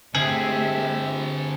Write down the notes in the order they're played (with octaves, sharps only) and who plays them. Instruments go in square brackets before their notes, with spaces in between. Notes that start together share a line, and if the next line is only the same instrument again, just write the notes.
[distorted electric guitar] D3 G4 [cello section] A3 E5 [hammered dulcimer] C4 D#5 G5 [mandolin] G#4